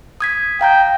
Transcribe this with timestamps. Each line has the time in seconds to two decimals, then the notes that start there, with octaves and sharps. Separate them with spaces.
0.20 D#6 G#6 B6
0.61 F5 G5 A#5 G6